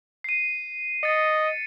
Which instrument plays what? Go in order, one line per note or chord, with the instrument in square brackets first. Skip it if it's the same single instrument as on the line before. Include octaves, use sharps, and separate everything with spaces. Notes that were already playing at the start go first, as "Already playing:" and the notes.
[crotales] C7 D#7
[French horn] D#5 [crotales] A6 C#7